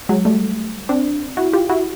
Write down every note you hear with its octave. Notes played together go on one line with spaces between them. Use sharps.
F#3 G#3
G3 A3
C4 D4
E4 F#4
F4 G4
E4 F#4